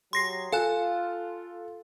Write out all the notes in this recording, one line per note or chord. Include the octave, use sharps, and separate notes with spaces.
F#3 G4 G#4 C6 A#6 C7
F4 A4 F5 G#5 F#6